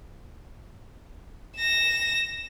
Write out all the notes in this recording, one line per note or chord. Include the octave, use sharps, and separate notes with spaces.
A#6 E7